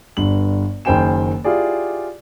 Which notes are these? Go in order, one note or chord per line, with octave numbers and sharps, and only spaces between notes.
G1 G2 F#7
F#1 D#3 C5 G5 G#5 E7
E4 F4 G4 G#4 D5